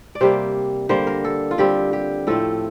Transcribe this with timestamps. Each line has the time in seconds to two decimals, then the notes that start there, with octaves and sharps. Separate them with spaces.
0.15 D5
0.21 C3 G3 A#3 C5
0.89 D3 G3 A#3 C5
1.07 A#4
1.24 A4
1.51 F4
1.58 D3 G3 C4 G4
1.93 G4
2.27 A2 F3 A3 C4 A4